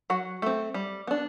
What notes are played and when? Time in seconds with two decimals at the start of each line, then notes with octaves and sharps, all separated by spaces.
0.10 F#3 F#4 F#5
0.42 A3 C4
0.74 G3
1.07 B3 D4